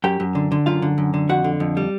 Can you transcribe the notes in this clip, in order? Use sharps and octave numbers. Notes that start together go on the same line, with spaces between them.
F#2 G4 G5
F#2
D3
D3
F#2 F4 F5
D3
F#2
D3
F2 F#4 F#5
D3
F2
G3